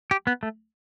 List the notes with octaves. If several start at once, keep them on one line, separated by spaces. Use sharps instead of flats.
G4
B3
A3